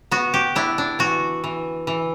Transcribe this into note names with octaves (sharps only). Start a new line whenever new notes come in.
B3 F#4
G4
D4 E4
D4
E3 F#4
E3
E3